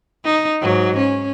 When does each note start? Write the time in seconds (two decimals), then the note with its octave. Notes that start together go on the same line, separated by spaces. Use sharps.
0.25 D#4
0.61 G#2 F#3
0.97 C#4